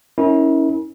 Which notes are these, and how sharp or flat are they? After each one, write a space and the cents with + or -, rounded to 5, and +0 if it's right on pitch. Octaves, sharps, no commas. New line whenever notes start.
C#4 +0 E4 -40 A#4 -5